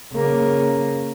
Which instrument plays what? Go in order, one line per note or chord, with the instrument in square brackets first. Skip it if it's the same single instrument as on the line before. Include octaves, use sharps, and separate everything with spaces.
[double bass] C#3 A#3